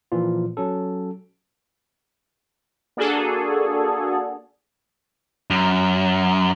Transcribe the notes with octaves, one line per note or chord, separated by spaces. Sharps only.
A#2 E3 F3 F4
F#3 C#4 A4
A#3 D4 F#4 G#4 A4
F#2